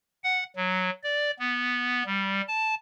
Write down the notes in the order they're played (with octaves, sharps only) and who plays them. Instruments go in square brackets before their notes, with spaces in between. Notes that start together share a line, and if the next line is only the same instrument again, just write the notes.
[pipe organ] F#5
F#3
D5
B3
G3
A5